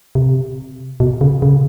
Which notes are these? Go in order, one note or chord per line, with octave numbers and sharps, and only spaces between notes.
C3
B2
C#3
C#3